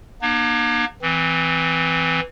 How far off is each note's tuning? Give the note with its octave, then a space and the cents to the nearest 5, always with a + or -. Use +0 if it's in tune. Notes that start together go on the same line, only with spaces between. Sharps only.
A#3 +40 D#4 -45
E3 +0 C4 -25